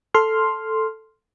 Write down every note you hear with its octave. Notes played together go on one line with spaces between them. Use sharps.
A4 C6 F6